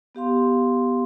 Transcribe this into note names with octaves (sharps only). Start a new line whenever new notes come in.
B3 G4 F5 C6